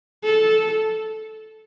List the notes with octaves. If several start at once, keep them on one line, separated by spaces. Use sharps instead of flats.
A4